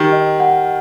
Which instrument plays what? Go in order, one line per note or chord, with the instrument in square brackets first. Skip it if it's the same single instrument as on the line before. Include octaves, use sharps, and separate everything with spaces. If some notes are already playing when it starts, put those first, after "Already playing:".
Already playing: [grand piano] D#3 [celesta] G4
[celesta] D#5
F#5